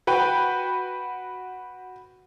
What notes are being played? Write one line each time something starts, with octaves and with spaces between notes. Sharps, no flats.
F#4 B4 G5